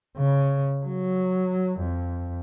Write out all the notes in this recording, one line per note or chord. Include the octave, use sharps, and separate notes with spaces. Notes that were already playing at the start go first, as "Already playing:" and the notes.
C#3
F#3
F2